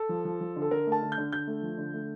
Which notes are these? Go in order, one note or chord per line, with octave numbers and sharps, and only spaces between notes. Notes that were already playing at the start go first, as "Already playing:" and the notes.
Already playing: A4
F3
F3
F3
D3
A4
D3 A#4
A3
A5
D3
G6
D3
D3 G6
A3
F3
D3
A3